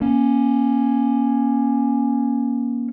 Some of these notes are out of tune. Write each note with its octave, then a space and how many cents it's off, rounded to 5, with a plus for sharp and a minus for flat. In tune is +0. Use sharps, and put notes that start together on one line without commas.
A#3 +30 C#4 +0